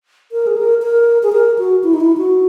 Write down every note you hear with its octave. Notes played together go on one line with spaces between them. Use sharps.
A#4
G#4
A#4
A#4
G#4
A#4
F#4
E4
D#4
E4
F#4